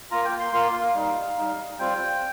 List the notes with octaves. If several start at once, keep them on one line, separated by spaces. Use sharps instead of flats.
A#3 F4 A#5
G5
C6
A#3 F4 C6
F5
G3 D#4
G3 D#4
G3 C4 F4 G5